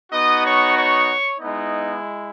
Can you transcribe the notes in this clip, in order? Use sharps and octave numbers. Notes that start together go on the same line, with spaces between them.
B3 D#4 F#4 D#5 D#6
C#5 C#6
C#5 C#6
G#3 B3 D#4 E4 D#5